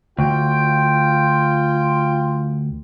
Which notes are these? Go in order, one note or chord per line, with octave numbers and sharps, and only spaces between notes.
D2 F4 G5